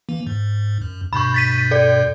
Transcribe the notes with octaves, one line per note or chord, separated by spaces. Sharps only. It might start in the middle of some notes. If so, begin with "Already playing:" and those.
E3 A#3
G#2
F#2
G2 B2 B5 C#6 G6
A6 B6 D#7
A4 D5